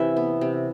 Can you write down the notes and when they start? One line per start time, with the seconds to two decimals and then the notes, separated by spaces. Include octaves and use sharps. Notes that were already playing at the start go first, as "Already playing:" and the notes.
Already playing: C3 E3 B4 E5
0.17 B3
0.41 C3